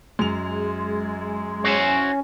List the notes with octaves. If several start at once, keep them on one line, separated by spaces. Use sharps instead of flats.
F#2 G#3 F7
C#4 E4 F#4 C5